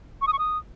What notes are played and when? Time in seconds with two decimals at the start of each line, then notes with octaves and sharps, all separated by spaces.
0.22 C#6
0.27 D#6
0.33 C#6
0.39 D#6